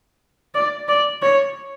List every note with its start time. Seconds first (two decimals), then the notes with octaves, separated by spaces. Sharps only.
0.55 D5
0.88 D5
1.22 C#5